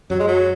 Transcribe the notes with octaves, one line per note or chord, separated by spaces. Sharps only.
F#2 F#3
G#3
F#3